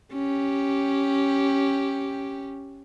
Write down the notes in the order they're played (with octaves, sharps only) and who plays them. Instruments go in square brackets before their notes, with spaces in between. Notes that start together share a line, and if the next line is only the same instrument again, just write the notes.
[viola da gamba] C#4 G4